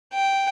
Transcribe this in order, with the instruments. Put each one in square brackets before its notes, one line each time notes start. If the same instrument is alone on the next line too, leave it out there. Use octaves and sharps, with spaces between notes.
[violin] G5